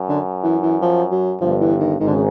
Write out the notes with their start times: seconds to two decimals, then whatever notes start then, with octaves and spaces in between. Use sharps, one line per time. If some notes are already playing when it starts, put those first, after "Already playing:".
Already playing: F#2
0.09 D3
0.43 E3
0.63 E3
0.82 F3
1.11 F#3
1.41 G1 G2 F3
1.61 E3
1.80 D#3
2.00 G#1 G#2 D#3
2.07 D3
2.15 C#3